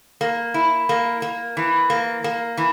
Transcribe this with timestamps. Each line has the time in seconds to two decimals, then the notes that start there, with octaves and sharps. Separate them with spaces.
0.21 A#3
0.54 E4
0.89 A#3
1.22 A#3
1.57 E3
1.90 A#3
2.24 A#3
2.57 E3